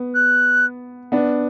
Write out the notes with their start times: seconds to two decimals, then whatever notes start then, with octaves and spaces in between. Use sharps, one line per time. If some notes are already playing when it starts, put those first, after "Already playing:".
Already playing: B3
0.15 F#6
1.12 B3 D4